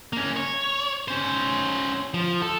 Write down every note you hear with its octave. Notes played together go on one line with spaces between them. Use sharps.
A#3 C#4
C#5
C#4 C5
F3
A4